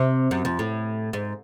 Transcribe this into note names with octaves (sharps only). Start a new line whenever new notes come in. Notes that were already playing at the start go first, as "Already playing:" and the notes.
Already playing: C3
F#2
F2
A2
G#2